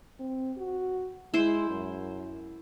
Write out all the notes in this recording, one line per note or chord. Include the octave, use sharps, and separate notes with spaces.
C4
F#4
G#3 E4 C5
F#2